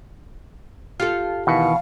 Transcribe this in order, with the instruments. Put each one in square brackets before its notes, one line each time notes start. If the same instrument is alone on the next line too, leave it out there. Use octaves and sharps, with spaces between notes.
[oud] F4 G4 A4 [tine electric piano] F5
[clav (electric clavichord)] B2 [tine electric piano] D#3 E3 C#7 [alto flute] F5